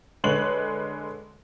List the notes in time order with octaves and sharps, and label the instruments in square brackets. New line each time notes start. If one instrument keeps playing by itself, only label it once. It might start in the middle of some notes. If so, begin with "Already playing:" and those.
[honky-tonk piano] D3 G#3 B4 C#5 F#7